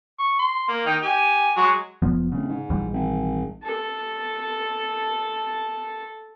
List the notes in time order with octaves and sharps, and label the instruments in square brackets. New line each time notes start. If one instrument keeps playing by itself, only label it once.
[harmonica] C#6
C6
A#3
D#3 D#4 G5
G4 G#5
F#3 G#3 C#6
[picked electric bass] F1 F3 B3
[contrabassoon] D1 [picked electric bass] C#3
[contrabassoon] G#2
[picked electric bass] A#1 E3 G3
[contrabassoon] G#1
[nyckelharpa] A4 A5